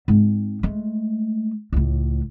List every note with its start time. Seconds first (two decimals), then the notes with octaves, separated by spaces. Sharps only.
0.08 G#2 C4
0.63 G#3 A3
1.72 C#2 A2